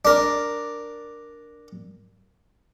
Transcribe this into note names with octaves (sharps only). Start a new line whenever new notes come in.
D4 A#4